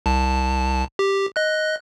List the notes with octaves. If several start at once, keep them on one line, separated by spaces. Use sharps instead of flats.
C2 A5
G4
D#5 F#6